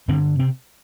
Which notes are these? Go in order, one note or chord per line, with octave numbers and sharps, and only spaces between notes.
G2 C3 D3 C4
C3 C4